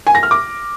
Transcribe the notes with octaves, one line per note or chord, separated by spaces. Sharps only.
G#5
A#6
F6
D6